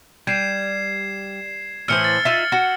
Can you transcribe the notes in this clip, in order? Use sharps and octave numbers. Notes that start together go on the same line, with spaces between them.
G3 G#6 C7 E7
A2 E3 C5 E6 F6 C#7
A6
D#4 F4 E5
F#4